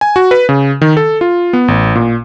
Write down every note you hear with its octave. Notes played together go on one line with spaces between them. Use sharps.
G#5
F#4
B4
C#3
D#3
A4
F4
B3
A1
A#2